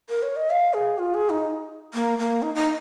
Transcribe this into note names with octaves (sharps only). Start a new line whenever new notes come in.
A#4
C#5
D#5
F5
G#4
F4
G#4
D#4
A#3
A#3
D#4
D#4